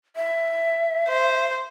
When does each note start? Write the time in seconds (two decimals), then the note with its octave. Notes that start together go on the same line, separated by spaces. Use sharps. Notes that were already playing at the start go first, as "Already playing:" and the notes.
0.16 E5
1.08 C5